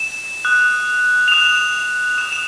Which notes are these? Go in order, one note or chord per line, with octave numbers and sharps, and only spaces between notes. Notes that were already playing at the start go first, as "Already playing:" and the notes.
Already playing: E7
D#6 F#6
F7
D#6 F#6 E7
D#6 F#6 E7
E7